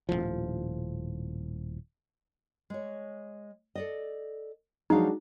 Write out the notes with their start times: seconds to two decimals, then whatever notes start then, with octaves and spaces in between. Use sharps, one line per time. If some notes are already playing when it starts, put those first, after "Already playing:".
0.09 D#1 C2 A2 F3
2.70 G#3 C#5
3.75 A4 D5 D#5
4.90 F3 F#3 G#3 D4 D#4 F#4 F5